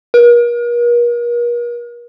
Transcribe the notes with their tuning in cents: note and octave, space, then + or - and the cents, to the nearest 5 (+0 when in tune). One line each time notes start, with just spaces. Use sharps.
A#4 +40